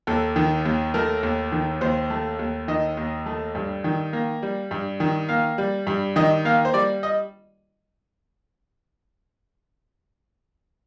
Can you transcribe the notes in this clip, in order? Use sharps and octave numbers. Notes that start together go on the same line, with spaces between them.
D#2 A4
D#3
D#2
A3 A#4
D#2
D#3
D#2 C5
A3
D#2
D#3 D#5
D#2
A3
G2
D#3
A#3
G3
G2
D#3
A#3 F5
G3
G2
D#3 D#5
A#3 F5
C5
G3 D5
D#5